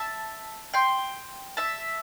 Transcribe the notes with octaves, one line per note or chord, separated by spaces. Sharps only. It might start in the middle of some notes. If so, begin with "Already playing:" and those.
Already playing: E5 A5
G5 C6
E5 A5